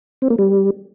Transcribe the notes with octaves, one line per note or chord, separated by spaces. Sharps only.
C4
A#3
G3